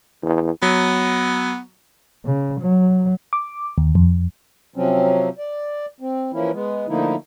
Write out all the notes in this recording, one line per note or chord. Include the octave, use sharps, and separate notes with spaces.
E2
F#3 B3
C#3
F#3
D6
D#2
F2
C3 F3 F#3 C4 C#4
D5
C4
E3 F3 A#3 C#4 E4
G#3 B3
D3 F3 A3 A#3 D#4 E4